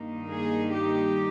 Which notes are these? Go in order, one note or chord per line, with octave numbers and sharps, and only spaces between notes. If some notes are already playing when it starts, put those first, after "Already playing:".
Already playing: G2 D#3 A#3 D#4
G#4
G4